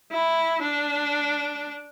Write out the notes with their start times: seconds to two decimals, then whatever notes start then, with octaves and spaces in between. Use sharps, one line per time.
0.12 E4
0.62 D4